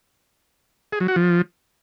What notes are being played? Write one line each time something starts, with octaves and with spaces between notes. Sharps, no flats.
G#4
F#3
F#4
F3